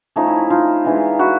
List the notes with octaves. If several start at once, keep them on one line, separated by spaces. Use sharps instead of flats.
F3 A3 C#4 D#4
E4
E4
D#4 F4
E3 G#3 B3 D4
E4 F#4